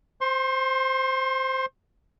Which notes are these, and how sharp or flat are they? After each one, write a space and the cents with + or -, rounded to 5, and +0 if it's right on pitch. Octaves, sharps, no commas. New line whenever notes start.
C5 +0 C6 +35